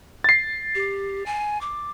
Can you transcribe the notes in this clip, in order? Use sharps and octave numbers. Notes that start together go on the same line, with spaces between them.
A6 C7
G4
G#5
D6